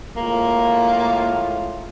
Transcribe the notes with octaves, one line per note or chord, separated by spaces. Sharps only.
A2 G#3 A#3 F4